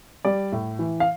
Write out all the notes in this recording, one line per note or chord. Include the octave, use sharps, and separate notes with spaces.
G3 D5
A2
E3
F5